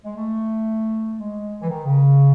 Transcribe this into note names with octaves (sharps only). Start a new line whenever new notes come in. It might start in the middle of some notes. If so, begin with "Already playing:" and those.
G#3
A3
G#3
E3
D#3
C#3